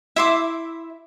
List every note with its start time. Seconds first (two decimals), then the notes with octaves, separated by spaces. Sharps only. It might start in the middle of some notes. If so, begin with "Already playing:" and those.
0.16 E4 E5 C6 D6